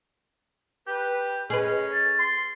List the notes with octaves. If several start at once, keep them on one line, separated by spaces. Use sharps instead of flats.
G4 B4
C#4 G#4 B4 D#5
A6
C6